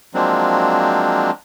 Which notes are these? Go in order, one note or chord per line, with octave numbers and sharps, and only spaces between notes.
F3 F#3 G#3 A#3 C4 D4